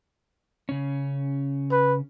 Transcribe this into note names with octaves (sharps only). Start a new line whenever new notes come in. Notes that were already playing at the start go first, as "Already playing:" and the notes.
C#3 C#4
B4